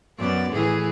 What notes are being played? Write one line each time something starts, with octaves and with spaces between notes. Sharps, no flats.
F#2 B3 D5
A2 E3 G#4